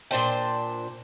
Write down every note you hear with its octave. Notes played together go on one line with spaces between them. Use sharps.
A#2 D4 C5 G5